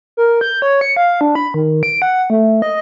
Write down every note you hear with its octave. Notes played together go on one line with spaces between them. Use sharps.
A#4
G6
C#5
C#7
F5
D4
B5
D#3
D7
F#5
A3
D#5